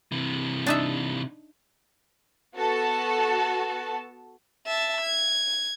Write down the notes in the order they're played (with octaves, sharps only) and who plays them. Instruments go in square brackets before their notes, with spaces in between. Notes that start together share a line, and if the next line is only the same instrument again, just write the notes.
[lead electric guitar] C3 E3
[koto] D4 D#4 E5
[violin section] B3 F#4 A4 A5
[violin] E5 A5
G#6